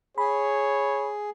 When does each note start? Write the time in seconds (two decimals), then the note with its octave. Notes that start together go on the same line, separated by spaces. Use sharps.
0.18 G#4 C#5 B5